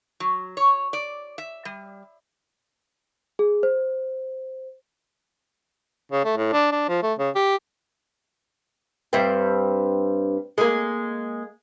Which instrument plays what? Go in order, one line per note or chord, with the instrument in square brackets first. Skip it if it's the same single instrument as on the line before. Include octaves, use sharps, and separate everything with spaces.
[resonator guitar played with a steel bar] F#3
C#5
D5
E5
G3
[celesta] G#4
C5
[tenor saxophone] C#3
A3
A2
D4
D4
F3
A3
C#3
G4
[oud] G2 C4
G#3 A#3